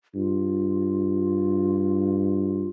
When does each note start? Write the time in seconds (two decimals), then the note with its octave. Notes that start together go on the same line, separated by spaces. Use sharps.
0.14 G2 F4